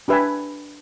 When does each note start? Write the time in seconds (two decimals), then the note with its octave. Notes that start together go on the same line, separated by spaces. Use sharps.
0.08 D4 G4 B4 E5 G#5